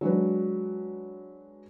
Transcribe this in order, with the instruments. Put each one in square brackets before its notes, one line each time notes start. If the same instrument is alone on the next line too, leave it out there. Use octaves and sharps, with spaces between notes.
[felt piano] F#3 G#3 D4 B4